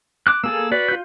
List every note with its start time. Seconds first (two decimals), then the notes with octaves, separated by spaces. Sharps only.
0.27 D6 F#6
0.44 A#3 G#4 A4 E6
0.72 F#4 B4 D5
0.89 F4 G6